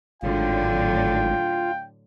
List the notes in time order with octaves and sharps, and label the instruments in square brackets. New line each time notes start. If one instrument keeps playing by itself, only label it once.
[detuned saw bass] G#1 [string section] A2 D3 F#3 [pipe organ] F4 [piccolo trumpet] G5